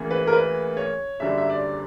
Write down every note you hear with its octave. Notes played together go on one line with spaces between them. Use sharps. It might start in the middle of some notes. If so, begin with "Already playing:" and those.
Already playing: D2 C#3 E3 A#3
B4
A#4
B4
C#5
F#1 F#2 D3 G3 E5
E5
D5